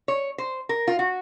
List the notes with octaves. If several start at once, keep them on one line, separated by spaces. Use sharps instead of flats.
C#5
C5
A#4
F4
F#4